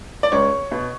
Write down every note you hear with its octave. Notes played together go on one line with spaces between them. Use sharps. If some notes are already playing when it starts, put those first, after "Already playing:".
D5
C#2 C#5
B2